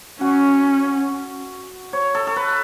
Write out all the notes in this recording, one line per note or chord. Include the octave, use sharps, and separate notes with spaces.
C#4 F#4
C#5
A4
A4
B4